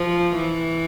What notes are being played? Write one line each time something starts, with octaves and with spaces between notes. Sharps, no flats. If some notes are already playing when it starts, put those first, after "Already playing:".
Already playing: F3
E3